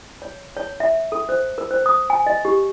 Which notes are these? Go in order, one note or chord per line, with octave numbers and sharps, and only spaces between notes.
C#5
C#5
E5
A4
C5
A#4
C5
D#6
G#5
D#5
G4